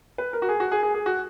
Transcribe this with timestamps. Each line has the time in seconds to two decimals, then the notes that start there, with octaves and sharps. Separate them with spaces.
0.18 B4
0.33 A#4
0.42 F#4
0.49 G#4
0.60 F#4
0.72 G#4
0.83 G#4
0.94 G#4
1.06 F#4